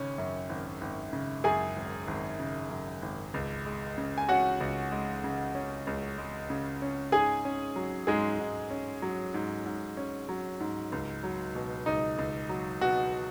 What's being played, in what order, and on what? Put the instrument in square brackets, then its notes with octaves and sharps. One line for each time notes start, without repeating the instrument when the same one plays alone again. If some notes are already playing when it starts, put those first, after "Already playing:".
Already playing: [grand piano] G#1 C#3 C#4
F#2
G#1
G#1
C#3
F#2 G#4 G#5
G#1
G#1
C#3
F#2
G#1
C#2
G#3
C#3
G#5
C#4 F#4 F#5
C#2
G#3
C#3
C#4
C#2
G#3
C#3
C#4
G#2 G#4 G#5
C#4
F#3
G#2 G#3 G#4
G#2
C#4
F#3
G#2
G#2
C#4
F#3
G#2
C#2
F#3
B2
C#2 D#4
C#2
F#3
B2 F#4